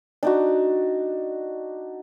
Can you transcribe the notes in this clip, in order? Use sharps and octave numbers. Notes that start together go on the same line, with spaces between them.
D4 D#4 F#4